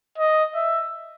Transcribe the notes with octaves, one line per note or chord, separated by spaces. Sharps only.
D#5
E5